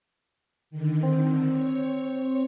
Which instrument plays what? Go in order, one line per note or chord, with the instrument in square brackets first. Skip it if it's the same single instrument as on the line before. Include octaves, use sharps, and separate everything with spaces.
[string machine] D3 D#3
[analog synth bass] C4
[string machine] C#5